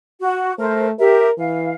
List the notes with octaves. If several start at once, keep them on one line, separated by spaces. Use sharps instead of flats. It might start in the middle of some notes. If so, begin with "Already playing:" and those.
F#4
A3 A#4 C5
G4 A#4 E5
E3 F5